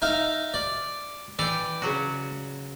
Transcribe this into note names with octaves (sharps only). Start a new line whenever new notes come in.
D#4 E5 F5
D5
E3 D5 G5
C#3 F#3 F#4